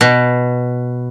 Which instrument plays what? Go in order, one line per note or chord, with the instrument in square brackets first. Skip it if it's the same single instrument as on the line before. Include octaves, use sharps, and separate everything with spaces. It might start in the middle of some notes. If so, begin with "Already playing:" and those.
[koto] B2